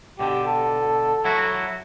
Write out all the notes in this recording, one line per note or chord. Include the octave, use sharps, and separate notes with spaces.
B2 D3 G4
A4
F#3 E4 F#4